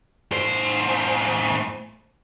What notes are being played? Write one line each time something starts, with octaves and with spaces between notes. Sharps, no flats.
A2 C5